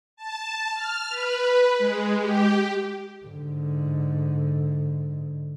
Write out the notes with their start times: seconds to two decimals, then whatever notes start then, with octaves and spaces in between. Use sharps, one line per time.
0.17 A5
0.74 F6
1.09 B4
1.78 G#3
2.20 G4
3.26 G#2 D3